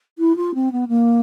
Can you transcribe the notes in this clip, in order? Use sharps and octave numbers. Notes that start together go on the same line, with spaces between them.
E4
F4
C4
B3
A#3